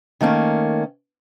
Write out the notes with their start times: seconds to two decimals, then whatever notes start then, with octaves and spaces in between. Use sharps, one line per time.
0.21 D#3 A3 A#3 C#4